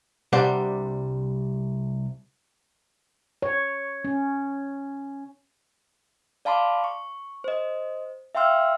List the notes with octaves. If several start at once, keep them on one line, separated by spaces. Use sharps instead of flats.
C2 G3 D4 C5 F#5
C#5
C#4
D5 F5 A5 B5 C6 D6
C#6
C5 D#5
E5 F5 G5 C6 E6 F6